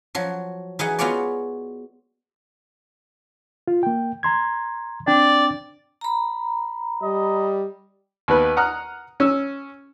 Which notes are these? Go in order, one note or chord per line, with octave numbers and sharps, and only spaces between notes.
F3 F#3
E3 D#4 G#4 F#5
B3 F4 F#4 G#4 C#5 D5
F4
A#3 G5
A#5 C6 G#6
C4 D4 D5 G5
A#5 B5
G3 D#5
D#2 B3 B4
F#5 A#5 D#6 F6 F#6
C#4 E6